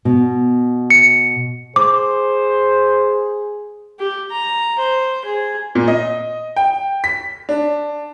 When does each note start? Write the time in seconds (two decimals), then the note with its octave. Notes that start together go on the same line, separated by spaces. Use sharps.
0.05 B2
0.90 C#7
1.76 G#4 C5 D6
3.99 G4
4.31 A#5
4.78 C5
5.25 G#4
5.75 A#2
5.88 D#5
6.56 G5
7.04 B6
7.49 D4